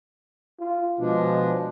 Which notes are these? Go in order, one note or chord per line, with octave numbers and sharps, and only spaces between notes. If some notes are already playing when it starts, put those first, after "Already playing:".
F4
B2 F3 G#3 D4